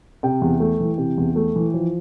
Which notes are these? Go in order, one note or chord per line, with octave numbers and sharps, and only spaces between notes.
C3 G5
E2
A3
E3
C3
E2
A3
E3
F3